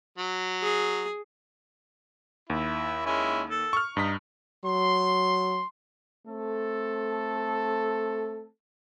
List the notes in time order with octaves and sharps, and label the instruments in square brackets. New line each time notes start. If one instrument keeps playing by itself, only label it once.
[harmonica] F#3
[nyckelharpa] G#4
[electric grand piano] D#2 [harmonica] E4
[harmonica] G#3 C#4 E4
A4
[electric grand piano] C#6 F6
[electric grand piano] G2 B6 [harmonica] D#4
[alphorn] F#3 [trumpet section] C6
[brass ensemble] A3 C4 A4